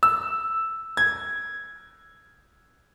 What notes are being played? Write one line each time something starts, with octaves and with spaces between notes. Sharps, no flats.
E6
G#6